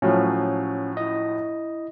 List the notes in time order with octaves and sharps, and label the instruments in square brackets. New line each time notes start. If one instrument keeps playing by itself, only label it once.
[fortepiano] A2 F3 F#3 [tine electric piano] C#4
[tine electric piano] E4 D#5